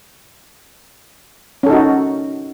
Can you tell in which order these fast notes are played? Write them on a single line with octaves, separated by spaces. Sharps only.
C#4 A4 D#4 F#4